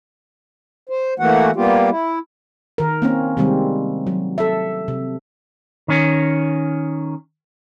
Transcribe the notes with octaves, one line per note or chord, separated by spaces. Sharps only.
C5
E3 A3 A#3 F#4 F#5
G3 A#3 B3 F4 G4
E4
D#3 A#4
A#3 C4 C#4
C3 D#3 G3 G#3 C4
F#3
A4 E5
C3
D#3 C#4